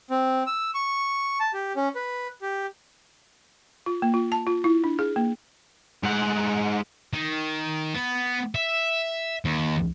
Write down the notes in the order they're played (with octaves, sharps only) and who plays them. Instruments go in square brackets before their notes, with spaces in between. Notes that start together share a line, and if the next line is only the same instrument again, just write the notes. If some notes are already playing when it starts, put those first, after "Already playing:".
[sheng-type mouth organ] C4
E6
C#6
A5
G4
C#4
B4
G4
[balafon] F4
A#3
F4
A5
F4
E4
D4
G#4
A#3
[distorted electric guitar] G#2 F#5
D#3
B3
E5
D#2